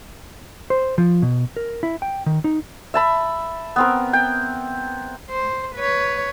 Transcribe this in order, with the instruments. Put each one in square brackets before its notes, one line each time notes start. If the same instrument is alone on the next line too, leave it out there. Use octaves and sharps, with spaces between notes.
[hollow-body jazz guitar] C5
F3
B2
A#4
E4
G5
D#3
D#4
[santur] E5 A5 B5
B3 C4 A#4
G5
[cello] C5
B4 C#5